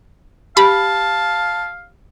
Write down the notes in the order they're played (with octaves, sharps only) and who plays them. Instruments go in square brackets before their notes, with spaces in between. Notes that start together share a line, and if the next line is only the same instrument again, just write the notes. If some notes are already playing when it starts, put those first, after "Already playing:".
[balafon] G4 [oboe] F5 [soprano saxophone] A5 [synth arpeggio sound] B5